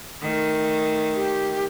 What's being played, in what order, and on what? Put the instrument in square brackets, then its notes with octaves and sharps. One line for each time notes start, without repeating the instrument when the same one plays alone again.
[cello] D#3 A3
[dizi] G4